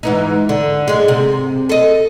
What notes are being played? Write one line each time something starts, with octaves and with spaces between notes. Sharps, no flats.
G#2 E3 D#4
D3
G#2 G#3
C3
A4 D#5